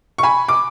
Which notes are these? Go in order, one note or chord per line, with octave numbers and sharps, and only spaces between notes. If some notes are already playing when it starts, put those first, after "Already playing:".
C#6
G#5 B5
D6